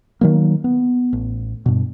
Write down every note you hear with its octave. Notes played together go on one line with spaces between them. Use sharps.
D#3 F#3 A#3
B3
A1
G2 B2